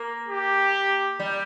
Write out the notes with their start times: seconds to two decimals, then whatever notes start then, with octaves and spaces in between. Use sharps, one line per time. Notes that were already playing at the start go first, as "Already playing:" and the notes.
Already playing: A#3
0.28 G4
1.20 G3